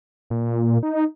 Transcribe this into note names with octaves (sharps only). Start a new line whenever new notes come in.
A#2
D#4